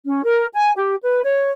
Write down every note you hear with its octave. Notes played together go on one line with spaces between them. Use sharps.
C#4
A#4
G#5
G4
B4
C#5